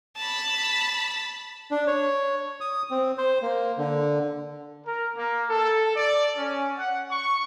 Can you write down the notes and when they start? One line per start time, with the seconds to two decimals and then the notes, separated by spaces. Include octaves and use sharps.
0.17 A5 B5
1.71 D4
1.87 C#5
2.61 D#6
2.91 C4
3.18 C5
3.42 A#3
3.78 D3
4.85 A#4
5.15 A#3
5.50 A4
5.96 D5
6.36 C#4
6.78 F#5
7.11 C#6